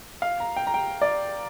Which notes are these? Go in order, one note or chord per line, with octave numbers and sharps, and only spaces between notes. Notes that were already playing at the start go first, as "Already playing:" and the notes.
F5
A#5
G5
A#5
G5
D5